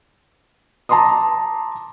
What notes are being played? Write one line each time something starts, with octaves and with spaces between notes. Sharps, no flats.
A5 A#5 C6 D6 D#6